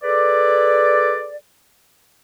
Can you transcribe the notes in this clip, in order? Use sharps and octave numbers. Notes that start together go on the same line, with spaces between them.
G#4 A4 B4 D5